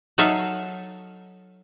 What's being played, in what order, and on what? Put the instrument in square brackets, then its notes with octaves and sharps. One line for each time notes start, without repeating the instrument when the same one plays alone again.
[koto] F#3 D#4 A4 C#5 E5 F5